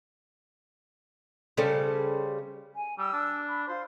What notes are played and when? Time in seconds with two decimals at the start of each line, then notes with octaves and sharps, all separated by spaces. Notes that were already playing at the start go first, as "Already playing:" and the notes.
1.57 C#3 G3 C#4 A4 C5
2.75 G#5
2.98 G3 E6
3.13 D4
3.48 B5
3.68 F4 C5